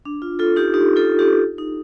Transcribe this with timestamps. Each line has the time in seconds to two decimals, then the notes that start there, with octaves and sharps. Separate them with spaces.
0.05 D4
0.22 F4
0.39 F4 A4
0.56 D#4 G4
0.74 D#4 G4
0.96 F4 A4
1.19 D#4 G4
1.58 D#4